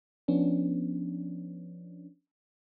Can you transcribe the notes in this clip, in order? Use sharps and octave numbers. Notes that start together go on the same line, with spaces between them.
F3 B3 C#4 D4